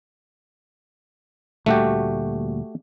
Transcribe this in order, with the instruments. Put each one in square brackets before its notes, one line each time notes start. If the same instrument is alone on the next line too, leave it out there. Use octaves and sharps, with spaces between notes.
[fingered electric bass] D2 A#2 G3 [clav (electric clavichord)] A3 F#4 G4